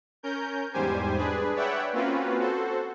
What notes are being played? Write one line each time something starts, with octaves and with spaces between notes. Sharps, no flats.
C#4 A#4 G6
E2 G#2 G3 G4 C5 G#5
D4 G#4 B4
B4 C#5 D5 E5 F#5 G5
A#3 C4 C#4 F4 F#4 B4
F#4 A4 C5